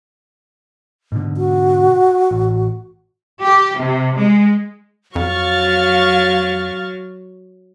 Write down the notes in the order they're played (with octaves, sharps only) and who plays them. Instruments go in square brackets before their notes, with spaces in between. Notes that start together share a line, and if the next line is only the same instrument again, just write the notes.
[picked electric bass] G#2 B2 D3
[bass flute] F#4
[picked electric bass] A1
[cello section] G4
C3
G#3
[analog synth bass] F2 [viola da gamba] F#3 [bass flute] F5 [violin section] C#6 F6 A6